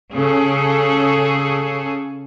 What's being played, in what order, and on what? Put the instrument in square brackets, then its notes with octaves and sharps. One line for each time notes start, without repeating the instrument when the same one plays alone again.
[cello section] C#3 G#4 A4